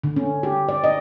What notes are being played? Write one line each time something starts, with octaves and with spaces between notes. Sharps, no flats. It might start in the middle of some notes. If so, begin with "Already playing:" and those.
D3
C#4
G4
D5
D#5